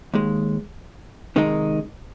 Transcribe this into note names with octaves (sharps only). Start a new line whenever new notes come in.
D#2 D#3 G#3
C3 D#3 G#3 D#4